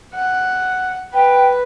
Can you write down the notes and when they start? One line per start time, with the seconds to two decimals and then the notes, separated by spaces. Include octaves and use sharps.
0.15 F#5
1.14 B4 G5